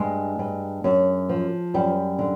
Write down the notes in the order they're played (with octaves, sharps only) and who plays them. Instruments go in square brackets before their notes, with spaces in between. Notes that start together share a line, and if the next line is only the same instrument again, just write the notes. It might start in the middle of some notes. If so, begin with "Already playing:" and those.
Already playing: [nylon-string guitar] G2 G#3
G2
F#2
F3
F#2 G3
D3